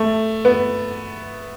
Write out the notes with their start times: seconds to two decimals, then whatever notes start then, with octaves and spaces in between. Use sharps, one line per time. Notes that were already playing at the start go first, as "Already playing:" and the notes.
Already playing: A3
0.45 B3